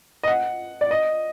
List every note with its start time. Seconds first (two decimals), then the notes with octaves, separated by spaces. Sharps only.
0.23 D#5
0.28 F#5
0.81 D5
0.91 D#5